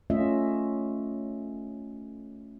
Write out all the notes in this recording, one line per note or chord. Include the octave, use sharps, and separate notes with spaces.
A3 C#4 F4 D#5 E5